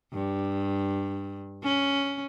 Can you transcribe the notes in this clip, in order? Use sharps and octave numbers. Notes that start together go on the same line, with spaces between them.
G2
C#4